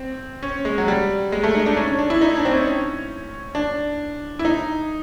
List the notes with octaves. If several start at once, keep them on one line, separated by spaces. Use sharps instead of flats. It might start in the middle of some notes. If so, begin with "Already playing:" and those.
Already playing: C4
C#4
G#3
F#3
G3
G#3
A3
D#4
D4
C#4
C#4
D4
E4
D#4
D4
C4
C#4
D4
E4
D#4